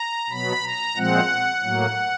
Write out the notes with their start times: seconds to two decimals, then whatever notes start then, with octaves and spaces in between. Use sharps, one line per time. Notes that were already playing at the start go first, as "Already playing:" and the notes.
Already playing: A#5
0.29 B2 F#3 B3 B5
0.63 A#5
0.96 A#2 F3 G#3 C4 F#5
1.63 A2 F#3 A#3